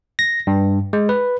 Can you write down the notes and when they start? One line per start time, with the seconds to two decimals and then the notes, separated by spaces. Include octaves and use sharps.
0.19 A#6
0.47 G2
0.93 G#3
1.09 B4